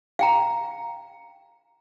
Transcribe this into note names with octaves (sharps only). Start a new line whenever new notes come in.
F5 G5 A#5